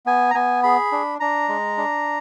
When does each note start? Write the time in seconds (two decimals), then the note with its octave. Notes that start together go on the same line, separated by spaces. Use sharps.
0.06 B3 G#5
0.31 A#5
0.35 B3 G#5
0.63 G#4 B5
0.92 D4
1.20 D4 A#5
1.49 G#3
1.77 D4